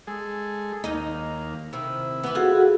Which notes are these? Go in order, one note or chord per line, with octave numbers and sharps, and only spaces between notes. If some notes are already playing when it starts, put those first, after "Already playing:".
G#3 G#4 A4
D#2 A#3 D#4
C3 D#3 E4
E3 B3
F4 F#4 G#4 A4 F#5